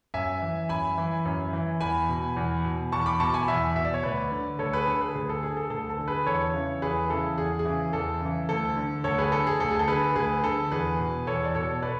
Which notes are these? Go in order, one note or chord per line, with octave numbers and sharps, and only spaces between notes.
F#2 E5 G#5
E3
F#2 G#5 B5
E3
F#2
E3
E2 G#5 B5
B2
E2
B2
E2 A5 C#6
B5 D6
B2 A5 C#6
G#5 B5
E2 E5 G#5
B2 E5
D5
C#5
D2 B4 D5
D3
D2 A4 C#5
G#4 B4
D3 A4
G#4 B4
D2 G#4
A4
D3 G#4
A4
D2 A4
A4
D3
G#4 B4
E2 A4 C#5
C#3 E3
E2 G#4 B4
C#3 E3 A4
E2 G#4
G#4
C#3 E3
E2 A4
C#3 E3
D2 A4
D3
D2 A4 C#5
G#4 B4
D3 A4
G#4
D2 A4
G#4
A4
D3 G#4 B4
D2 G#4 B4
D3 A4
E2 G#4 B4
B2
E2 A4 C#5
D5
B2 A4 C#5
B4 D5